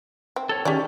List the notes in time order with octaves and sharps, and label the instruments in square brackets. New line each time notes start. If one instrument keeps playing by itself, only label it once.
[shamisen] C4
[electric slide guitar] A4 C#5
[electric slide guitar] D#3 C#4 [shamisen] G4 G#4 D5